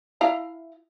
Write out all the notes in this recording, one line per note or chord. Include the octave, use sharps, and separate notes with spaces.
E4 F5 A#5